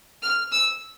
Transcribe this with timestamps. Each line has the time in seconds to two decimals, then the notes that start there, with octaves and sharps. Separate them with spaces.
0.23 F6
0.52 E6